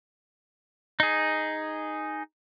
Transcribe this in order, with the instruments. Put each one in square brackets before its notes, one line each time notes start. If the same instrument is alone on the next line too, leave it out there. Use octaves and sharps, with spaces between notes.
[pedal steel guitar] D#4 G#4